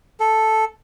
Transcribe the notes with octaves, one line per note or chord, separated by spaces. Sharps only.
A4